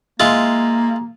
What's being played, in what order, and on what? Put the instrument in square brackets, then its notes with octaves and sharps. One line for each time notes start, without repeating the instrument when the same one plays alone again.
[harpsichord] G#3 E4 F4 [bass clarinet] A#3